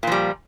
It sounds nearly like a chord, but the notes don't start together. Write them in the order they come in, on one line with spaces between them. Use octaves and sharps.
A#2 F3 G3